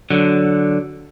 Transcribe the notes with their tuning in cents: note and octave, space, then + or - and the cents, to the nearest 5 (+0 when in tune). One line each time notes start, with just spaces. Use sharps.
D3 +0 F#3 +5